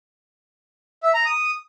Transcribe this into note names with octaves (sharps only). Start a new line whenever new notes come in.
E5
A#5
D#6